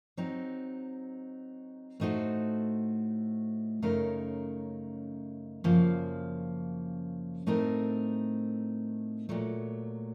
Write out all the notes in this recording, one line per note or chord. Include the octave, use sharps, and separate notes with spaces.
F#3 C4 D#4
A2 A3 D#4 F#4 C5
F#2 C#3 A3 D#4 A#4
F#2 C#3 F3 A#3
A2 A3 C4 D#4 A#4
A#2 F#3 A3